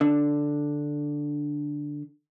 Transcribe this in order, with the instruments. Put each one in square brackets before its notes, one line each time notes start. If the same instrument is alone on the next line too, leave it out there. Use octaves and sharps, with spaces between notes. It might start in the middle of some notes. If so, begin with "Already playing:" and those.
[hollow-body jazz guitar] D3 D4